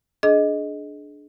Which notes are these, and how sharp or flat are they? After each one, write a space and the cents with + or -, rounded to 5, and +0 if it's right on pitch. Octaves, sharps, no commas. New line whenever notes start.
D4 +0 G#4 +30 D#5 +0